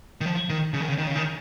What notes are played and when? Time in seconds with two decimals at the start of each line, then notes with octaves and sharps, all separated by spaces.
0.21 D#3
0.26 F3
0.50 D#3
0.73 C#3
0.81 D#3
0.88 C#3
0.98 D#3
1.07 C#3
1.16 D#3